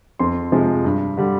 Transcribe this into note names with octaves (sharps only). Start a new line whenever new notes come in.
F2 C6
C3 F3 G#3
G2
D3 G3